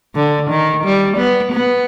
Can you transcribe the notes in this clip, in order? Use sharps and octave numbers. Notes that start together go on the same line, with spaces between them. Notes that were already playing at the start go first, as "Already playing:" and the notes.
D3
D#3
G3
B3
B3